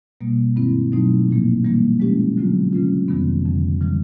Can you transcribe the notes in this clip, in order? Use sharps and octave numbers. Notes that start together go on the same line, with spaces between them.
B2 G3 A#3
G2 D#3 G#3 C4 E4
B2 F#3 A3 C4 D#4
A#2 F3 A#3
E3 G3 A#3 D4
F3 G#3 C#4 E4 G4
D3 F#3 A3 C4 F4
C#3 F#3 A3 C#4 F4
F2 C3 D#3 G3 B3
F2 D3 F3
C#3 E3 G3